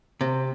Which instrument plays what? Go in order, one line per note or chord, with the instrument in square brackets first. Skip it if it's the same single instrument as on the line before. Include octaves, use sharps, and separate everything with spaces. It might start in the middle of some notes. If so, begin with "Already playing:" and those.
[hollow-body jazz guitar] C3